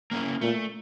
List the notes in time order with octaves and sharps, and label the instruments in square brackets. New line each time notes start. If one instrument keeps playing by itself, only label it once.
[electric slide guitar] A#3 C#4 E4
[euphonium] A#2 [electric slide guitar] A3